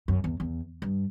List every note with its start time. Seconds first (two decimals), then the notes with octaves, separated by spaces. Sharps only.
0.08 F#2
0.24 E2
0.40 E2
0.82 G2